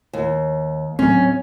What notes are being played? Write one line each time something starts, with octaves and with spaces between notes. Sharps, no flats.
D#2
F#3 C4 C#4